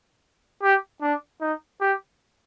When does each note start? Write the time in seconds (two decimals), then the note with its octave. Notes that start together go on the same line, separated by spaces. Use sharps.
0.63 G4
1.02 D4
1.41 D#4
1.81 G4